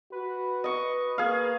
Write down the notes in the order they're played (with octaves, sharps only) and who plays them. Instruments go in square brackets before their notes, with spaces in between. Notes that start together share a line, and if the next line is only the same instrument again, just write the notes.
[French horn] F#4 [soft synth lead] B4
[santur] D#5 C#6
[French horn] A#3 [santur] G#4 F5